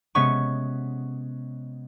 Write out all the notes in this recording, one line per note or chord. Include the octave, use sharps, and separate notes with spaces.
C3 G#3 B3 C#4 C#6